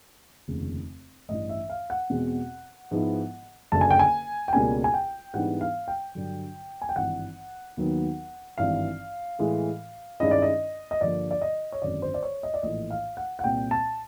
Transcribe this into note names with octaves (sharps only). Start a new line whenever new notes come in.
F1 D#2 C#3
A1 G2 E3 D#5
E5
F5
F#5
E2 B2 G#3 C4
G#2 F3 G#3 B3 E4
F#1 F#2 D3 A5
G#5
G5
G#5
G5
C#2 B2 G3 A#3 C#4 G#5
G#5
G5
G#2 E3 G3 B3 D4 F#5
F5
G5
G2 D3 F#3
G#5
G5
G#1 G2 E3 F#5
D#2 D#3 F#3 B3 D#4
G#1 G2 E3 F5
A2 E3 G#3
G2 D#3 G#3 C#4 E4 D#5
D5
D#5
D#5
G2 D3 F3 A#3 D5
D5
D#5
C#5
G#1 F#2 D3 D5
C5
D5
C#5
D#5
D5
A#1 A2 E3 D#5
F5
F#5
F#5
C2 A#2 G3 C4 G5
A5